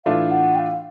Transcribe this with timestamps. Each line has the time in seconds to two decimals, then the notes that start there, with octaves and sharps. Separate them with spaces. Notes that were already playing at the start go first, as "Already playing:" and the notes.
0.05 A2 E3 A3 D4 F4 F5
0.31 F#5
0.55 G5
0.59 F5